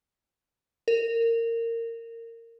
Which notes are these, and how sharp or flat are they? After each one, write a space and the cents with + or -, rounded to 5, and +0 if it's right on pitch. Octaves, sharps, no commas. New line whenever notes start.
A#4 -20